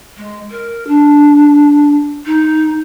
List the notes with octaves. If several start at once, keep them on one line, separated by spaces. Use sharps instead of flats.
G#3
A#4
D4
D#4